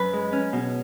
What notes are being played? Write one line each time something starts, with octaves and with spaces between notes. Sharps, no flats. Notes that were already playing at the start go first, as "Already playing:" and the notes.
Already playing: F#2 B4
G#3
C#4
B2